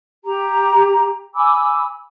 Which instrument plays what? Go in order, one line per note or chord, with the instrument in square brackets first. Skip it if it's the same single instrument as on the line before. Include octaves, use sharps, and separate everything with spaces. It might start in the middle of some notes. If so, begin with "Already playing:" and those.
[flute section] G4 A#5
G#5 B5 D6 E6